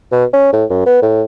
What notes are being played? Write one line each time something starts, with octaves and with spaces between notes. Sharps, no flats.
B2
C#4
A2
F#2
B3
A2